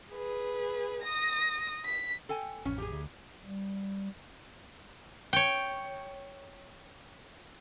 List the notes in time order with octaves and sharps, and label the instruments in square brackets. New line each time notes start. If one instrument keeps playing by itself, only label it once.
[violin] G#4 B4
D#6 A#6
B6
[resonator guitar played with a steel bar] A4 G5 G#5
[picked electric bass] A1 F2 [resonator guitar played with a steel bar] C#4 C#5
[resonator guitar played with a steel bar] G4 G#4
[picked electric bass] D2
[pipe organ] G3
[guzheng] C#5 G5